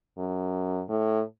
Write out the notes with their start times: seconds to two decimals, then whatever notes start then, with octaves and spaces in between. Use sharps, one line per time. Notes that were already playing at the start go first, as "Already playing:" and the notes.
0.18 F#2
0.89 A2